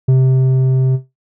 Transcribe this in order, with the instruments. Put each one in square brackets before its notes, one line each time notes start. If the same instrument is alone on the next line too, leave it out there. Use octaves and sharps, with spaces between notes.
[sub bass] C3